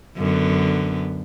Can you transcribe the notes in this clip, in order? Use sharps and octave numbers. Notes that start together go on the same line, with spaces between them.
F#2 D3 B3